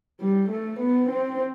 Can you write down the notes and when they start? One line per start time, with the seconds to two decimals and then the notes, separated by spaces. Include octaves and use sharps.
0.21 G3
0.50 A3
0.80 B3
1.09 C4